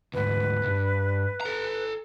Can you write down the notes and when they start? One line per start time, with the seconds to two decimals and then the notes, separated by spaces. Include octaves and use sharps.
0.14 D2 G#2 B4
0.64 C2 G2
1.41 A4 A#5